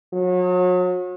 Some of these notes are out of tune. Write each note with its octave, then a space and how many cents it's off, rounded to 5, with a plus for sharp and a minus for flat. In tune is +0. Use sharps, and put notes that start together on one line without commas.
F#3 -35